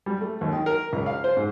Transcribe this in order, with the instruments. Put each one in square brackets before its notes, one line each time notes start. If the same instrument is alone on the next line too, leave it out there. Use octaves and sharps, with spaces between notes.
[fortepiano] G3
A3
D#2
D#3
A#4
C#2
F5
C5
G#2